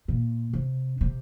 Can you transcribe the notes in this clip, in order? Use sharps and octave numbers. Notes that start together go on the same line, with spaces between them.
A#2
C3
C3